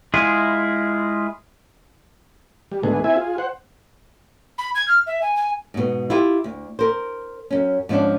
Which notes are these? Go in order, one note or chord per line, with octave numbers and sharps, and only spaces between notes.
G#3 E4 F4 G#4
G3
G#2 D3 A3 B3 G#4
C4 E4 E5 G#5
F4 G#4
C5 F#5
B5
G#6
F6
E5
G#5
G#5
G#2 B2
E4 F4 G4
D2
A#4 C5
F#2 C#4
G#2 F3 C#4 D4